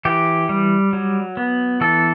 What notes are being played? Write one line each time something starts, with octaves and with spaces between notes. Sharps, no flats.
E3 G4
G3
F#3
B3
E3 A4